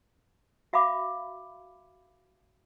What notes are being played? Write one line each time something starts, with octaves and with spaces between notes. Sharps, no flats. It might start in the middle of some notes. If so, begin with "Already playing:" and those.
F#4 E5 F5 B5 D6